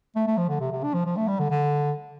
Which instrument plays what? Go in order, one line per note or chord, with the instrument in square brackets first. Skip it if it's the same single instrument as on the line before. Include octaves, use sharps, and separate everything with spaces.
[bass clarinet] A3
A3
F3
D3
C3
C3
D4
F3
F3
A3
G3
D3
D3